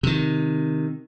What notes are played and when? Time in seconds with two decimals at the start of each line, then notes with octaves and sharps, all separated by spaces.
0.03 C3 D#3